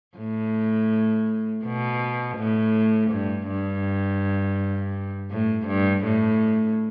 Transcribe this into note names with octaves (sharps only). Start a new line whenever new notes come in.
A2
B2
A2
G2
G2
A2
G2
A2